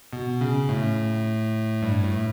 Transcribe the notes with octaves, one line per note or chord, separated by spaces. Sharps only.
B2
C#3
A2
G2
A2